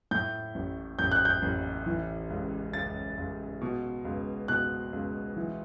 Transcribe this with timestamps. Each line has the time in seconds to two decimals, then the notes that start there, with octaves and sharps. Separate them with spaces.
0.11 A2 G6
0.55 A1
0.99 A1 G6
1.12 F#6
1.25 G6
1.42 A1
1.86 E3
2.30 C#2
2.73 C#2 A6
3.17 C#2
3.61 B2
4.05 C#2
4.48 B2 F#6
4.93 C#2
5.36 E3